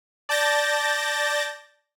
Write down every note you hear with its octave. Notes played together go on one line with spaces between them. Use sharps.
D5 A5 G6 A6 A#6